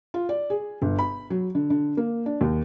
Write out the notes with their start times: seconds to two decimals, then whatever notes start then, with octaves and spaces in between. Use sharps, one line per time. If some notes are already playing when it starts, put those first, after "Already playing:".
0.14 F4
0.29 D5
0.50 G#4
0.82 G1
0.99 B5
1.30 F#3
1.55 D3
1.70 D3
1.97 A#3
2.26 D4
2.41 D#2